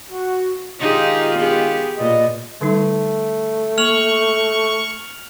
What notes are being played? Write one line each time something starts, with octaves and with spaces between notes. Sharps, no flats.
F#4
D#3 G#3 D#4 F4 G4 G#4
B3 G4 G#4
A#2 F4 B4 D#5
D3 G3 A3 D#4
A#3 C#6 F6 F7 F#7